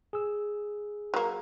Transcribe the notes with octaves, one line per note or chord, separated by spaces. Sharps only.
G#4 E6
F#3 A#3